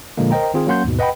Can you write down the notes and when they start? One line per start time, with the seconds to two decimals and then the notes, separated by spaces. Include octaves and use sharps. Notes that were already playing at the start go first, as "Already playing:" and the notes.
0.18 A#2 D3 F3 G#3 A#3
0.31 A#4 C5 D#5 G5 A#5
0.54 D#3 C4 F4 G#4
0.67 F#3 A#3 C#4 F#5 C6 G6
0.85 D#2 G#2 B2
0.99 B4 D#5 F#5 G5 B5